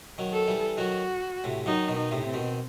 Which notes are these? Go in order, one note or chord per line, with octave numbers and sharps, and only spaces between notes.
D#3 F#3
A4
E3 G3
D#3 F#3 F#4
A2 C3
D#3 F#3 D#4
B2 D#3
D#4
A2 C3
C4
B2 D#3